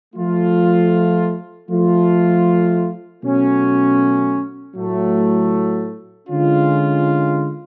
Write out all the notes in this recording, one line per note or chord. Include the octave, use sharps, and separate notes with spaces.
F3 A3 F4
F3 A3 F4
B2 F#3 A3 C#4
A2 F#3 A3
D3 G#3 C#4 F4